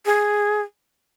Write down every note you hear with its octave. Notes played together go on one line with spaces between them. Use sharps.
G#4